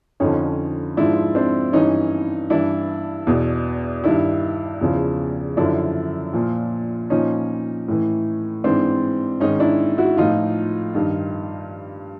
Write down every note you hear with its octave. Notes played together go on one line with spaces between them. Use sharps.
F2 D3 F3 C#4 D#4
G#2 F3 D4 E4
C4 D4
G2 E3 C#4 D#4
G2 E3 D4 E4
E2 B2
G2 D#3 D4 E4
E2 C#3 F3
F#2 D3 F3 D4 E4
A#2 F3
A#2 F3 C#4 D#4
A2 E3
G#2 E3 C4 D4
G#2 D#3 C#4 D#4
D4 E4
E4 F#4
A2 F3 D#4 F4
G2 D#3